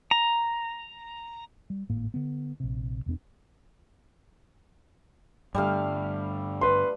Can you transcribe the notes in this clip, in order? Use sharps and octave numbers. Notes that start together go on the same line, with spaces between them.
A#5
G3
G#1 A2 A#3
D3 B3
A#1 C3
E1 E2 B3 D4
G2 D3 G3 A3 F5
B4 C6